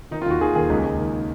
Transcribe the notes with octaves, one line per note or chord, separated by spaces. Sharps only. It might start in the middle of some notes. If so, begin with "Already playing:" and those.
D#3 D#4
F4
D#2 F#4
D#3 G#4
D#2 G#4
C#2
C#2
D#3